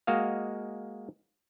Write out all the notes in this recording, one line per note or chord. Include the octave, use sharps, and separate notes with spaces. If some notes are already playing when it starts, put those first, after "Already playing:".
G#3 A#3 F#4 D#5 F5